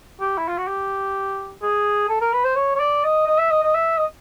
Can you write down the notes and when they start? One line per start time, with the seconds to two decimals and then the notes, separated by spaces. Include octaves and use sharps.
0.20 G4
0.38 E4
0.48 F4
0.58 F#4
0.68 G4
1.62 G#4
2.09 A4
2.21 A#4
2.33 B4
2.44 C5
2.56 C#5
2.75 C#5
2.80 D5
3.04 D#5
3.27 D#5
3.38 E5
3.51 D#5
3.63 D#5
3.74 E5
3.97 D#5